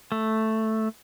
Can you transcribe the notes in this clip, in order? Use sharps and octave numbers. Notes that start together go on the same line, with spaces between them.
A3